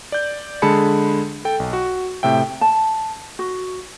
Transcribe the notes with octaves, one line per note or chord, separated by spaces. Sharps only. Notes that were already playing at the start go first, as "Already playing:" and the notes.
D5 G6
D3 G#3 G#4 A5 B5 C#7
A4 G5
B1
F#4
A2 C3 E5 G5
A5
F#4